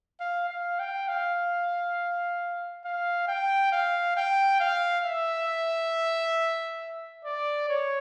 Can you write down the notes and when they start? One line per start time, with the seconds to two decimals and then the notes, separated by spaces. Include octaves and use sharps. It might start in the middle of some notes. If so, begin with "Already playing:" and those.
0.20 F5
0.49 F5
0.79 G5
1.08 F5
2.84 F5
3.28 G5
3.72 F5
4.17 G5
4.60 F5
5.05 E5
7.25 D5
7.69 C#5